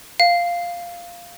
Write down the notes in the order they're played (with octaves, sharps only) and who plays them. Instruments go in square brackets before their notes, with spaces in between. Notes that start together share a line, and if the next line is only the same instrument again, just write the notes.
[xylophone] F5